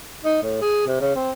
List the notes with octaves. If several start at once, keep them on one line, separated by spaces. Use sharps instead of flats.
D#4
A2
G#4
C3
C#3
C4